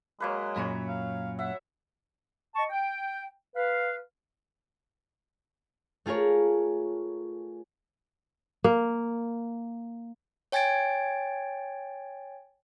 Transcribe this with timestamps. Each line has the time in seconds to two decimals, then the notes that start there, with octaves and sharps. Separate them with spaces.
0.20 F#3 G#3 A#3 B4
0.56 F#2 A#2 C#5 A#5 B5
0.88 F5
1.39 E5 F#5
2.56 D#5 A5 C#6
2.70 G5
3.56 B4 F5
6.06 A3 F4 G#4 A#4 C#5
8.64 A#3
10.52 C#5 G5 G#5 G#6 A6 D7